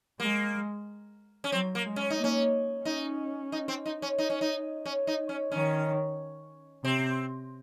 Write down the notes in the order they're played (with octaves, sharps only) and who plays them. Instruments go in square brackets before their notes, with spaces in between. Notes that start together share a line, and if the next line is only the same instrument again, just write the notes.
[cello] G#3 [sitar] A#3
[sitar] C#4
[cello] F#3 [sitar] C4
[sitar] A#3
[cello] G#3
[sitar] C#4
D#4
[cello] A#3 [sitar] C#4
[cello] C#4 [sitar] D#4
[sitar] D#4
C4
D#4
C#4
D#4
C#4
D#4
C#4
D#4
C#4
[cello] D#3 [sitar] C#4
[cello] C3 [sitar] C4